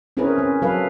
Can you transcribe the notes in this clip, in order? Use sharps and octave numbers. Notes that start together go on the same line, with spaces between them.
C4 C#4 E4 G#4 A#4 B4
C#4
F#3 A4 B4 F5